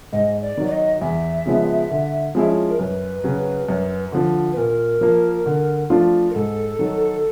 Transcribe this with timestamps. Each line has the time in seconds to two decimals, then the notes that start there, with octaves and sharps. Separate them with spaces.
0.13 G#2 D#5
0.42 D5
0.57 D#3 F#3
0.67 D5
0.72 D#5
1.01 E2 E5
1.46 C#3 F3 G#3 B3
1.91 D3
2.35 F3 G#3 C#4 E4
2.69 A#4
2.79 F#2 B4
3.24 C#3 F#3
3.69 F#2
4.12 D3 F3
4.53 B4
4.57 A#2 A#4
5.01 F3 A#3
5.46 D3
5.90 F3 A3 D4 F4
6.30 A#4
6.34 G#2 A4
6.79 D#3 F#3